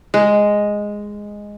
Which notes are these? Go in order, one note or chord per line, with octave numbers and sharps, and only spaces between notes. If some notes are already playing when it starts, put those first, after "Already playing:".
G#3